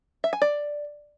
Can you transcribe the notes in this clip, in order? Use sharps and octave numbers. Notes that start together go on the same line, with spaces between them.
E5
G#5
D5